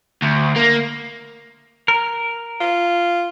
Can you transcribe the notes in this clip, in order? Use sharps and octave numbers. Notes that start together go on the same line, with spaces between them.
D2
A#3
A#4
F4